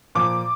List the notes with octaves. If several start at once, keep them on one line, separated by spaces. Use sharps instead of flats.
A#2 F3 D6